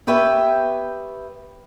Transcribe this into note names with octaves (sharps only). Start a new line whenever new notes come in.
B3 G4 B4 C#5 E5 G5